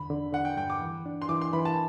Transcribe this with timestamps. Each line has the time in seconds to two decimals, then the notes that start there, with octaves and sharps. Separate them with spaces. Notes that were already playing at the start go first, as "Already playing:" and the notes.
Already playing: E2 D3 B5
0.10 D3
0.33 D3 F#5
0.45 G5
0.57 G2 G5
0.70 D6
0.82 E3
1.06 D4
1.22 C6
1.29 E3 D6
1.41 C6
1.53 E3 B5
1.65 A5